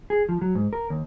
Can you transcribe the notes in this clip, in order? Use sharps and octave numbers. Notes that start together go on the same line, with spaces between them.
G#4
F3
F#3
G#2
A#4
D#2